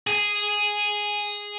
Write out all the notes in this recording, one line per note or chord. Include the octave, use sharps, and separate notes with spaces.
G#4